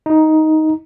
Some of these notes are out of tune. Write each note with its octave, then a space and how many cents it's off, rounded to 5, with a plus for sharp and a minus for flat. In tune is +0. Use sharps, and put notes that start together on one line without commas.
D#4 +10